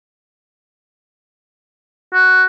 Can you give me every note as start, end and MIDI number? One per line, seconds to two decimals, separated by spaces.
2.13 2.44 66